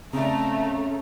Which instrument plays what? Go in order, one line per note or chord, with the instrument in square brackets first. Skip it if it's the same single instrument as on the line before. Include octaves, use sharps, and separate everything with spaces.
[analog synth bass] C#3 [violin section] A3 [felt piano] C4 D5 [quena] A#5